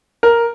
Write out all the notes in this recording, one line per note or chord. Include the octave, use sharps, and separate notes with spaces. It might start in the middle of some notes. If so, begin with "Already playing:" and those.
A#4